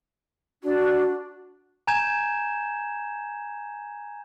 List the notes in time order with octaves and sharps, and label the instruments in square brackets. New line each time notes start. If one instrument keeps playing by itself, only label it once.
[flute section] D4 [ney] F#4
[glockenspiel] G#5 A#5 G6 G#6 E7